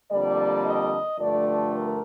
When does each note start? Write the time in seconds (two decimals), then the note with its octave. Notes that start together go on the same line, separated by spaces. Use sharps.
0.11 F2 D3 G3 A#3 D5
0.65 D#5
1.19 G2 D3 F3 A3 D5
1.73 A#4